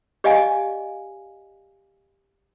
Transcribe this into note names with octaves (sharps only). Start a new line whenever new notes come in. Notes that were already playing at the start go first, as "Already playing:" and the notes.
G4 D5 D#5 F5 G#5